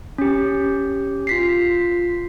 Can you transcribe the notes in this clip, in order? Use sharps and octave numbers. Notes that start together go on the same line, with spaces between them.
C#4 G4
F4 B6 C7